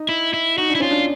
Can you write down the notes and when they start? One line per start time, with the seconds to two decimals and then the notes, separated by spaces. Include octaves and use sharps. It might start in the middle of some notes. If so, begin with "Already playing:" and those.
Already playing: D#4
0.09 E4
0.34 E4
0.57 D#4 F#4
0.69 D4
0.75 E4
0.80 C#4 F4
0.91 D4